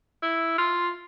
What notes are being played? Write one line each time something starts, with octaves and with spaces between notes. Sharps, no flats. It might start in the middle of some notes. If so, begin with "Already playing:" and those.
E4
F4